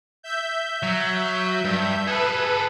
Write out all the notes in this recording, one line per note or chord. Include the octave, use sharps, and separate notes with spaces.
E5 G6
F#3
G2
G#4 A4 B4